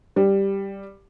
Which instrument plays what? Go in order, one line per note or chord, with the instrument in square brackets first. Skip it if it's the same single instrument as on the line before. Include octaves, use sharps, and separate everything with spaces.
[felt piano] G3